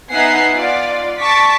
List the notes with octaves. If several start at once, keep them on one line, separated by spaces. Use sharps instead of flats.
B3 D#4 E5 F#5 G#5 C7
F4 D5
A5 C#6 D6 B6